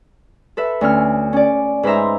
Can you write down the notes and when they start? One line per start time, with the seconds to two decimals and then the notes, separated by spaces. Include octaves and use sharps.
0.57 A4 B4 E5
0.81 D2 C#4 F6
1.33 C#4 D5
1.83 G#2 B4 C5 D#5 E5 A#5